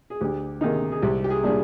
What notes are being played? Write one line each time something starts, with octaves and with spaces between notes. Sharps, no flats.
G#4
D2 G4
C3 D#3 A#3 D#4 G#4
G#4
C2 G4
G4
G#4
A#2 G3 D4 G#4